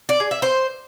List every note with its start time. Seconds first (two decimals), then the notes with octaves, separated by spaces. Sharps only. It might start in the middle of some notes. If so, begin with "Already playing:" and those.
0.09 D5
0.20 G#4
0.31 E5
0.42 C5